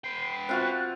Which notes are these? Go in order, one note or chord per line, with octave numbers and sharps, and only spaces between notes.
B3 G5 C7
C4 F4 F#4 F#6